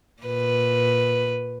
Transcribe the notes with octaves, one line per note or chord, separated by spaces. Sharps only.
A#2 B4